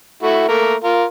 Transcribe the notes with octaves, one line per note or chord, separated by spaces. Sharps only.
A3 E4 F#4
A3 A#3 A#4
F4 A#4